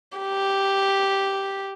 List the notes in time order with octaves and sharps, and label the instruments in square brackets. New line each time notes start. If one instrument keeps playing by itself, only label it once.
[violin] G4